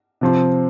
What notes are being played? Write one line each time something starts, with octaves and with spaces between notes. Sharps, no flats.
C3 F3 C4